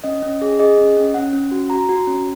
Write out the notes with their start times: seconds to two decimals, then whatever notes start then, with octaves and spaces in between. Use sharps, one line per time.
0.04 C#4 D#5
0.23 C#4
0.42 G#4
0.59 G#4 D#5
0.78 C#4
0.97 C#4
1.14 C#4 F#5
1.33 C#4
1.51 F#4
1.70 F#4 A#5
1.89 F#4
2.07 C#4